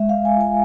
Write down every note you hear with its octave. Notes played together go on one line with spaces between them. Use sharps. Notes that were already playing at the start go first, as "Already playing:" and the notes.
Already playing: G#3 E5
F5
G#3
G#5
F4
G#5